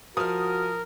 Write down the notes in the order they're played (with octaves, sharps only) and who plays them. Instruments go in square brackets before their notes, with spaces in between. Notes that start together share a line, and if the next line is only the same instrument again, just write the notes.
[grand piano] F3 [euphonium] F#4 [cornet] A#4 [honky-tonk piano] D#6 F6